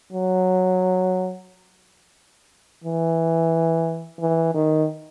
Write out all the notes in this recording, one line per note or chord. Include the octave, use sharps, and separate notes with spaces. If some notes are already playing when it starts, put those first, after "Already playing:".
F#3
E3
E3
D#3